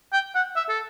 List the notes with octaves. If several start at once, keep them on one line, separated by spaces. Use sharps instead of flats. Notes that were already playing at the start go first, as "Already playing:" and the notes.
G5
F#5
E5
A4